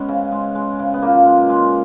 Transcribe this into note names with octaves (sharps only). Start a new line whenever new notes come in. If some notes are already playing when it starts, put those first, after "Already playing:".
Already playing: G#3 B3 C#4
C#3
G#3
G#3
C#3
B3
A#2 A#3
G#3
G#3